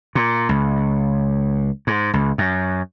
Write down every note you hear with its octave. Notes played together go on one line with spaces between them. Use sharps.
A#2
C#2
G#2
C#2
F#2